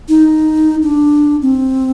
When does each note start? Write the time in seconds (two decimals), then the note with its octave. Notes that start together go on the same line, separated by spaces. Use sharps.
0.08 D#4
0.82 D4
1.42 C4